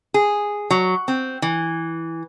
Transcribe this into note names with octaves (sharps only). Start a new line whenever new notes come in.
G#4
F#3
C4
E3